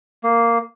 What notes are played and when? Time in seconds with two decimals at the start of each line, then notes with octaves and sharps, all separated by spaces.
0.24 A#3